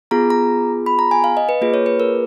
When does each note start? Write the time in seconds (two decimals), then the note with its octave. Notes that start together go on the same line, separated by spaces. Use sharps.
0.11 B3 F4 G#4 A#5
0.30 A#5
0.86 B5
0.99 A#5
1.11 G#5
1.24 F5
1.37 D#5
1.49 B4
1.61 A#3 F4 G#4 B4
1.74 C#5
1.86 B4
2.00 A#4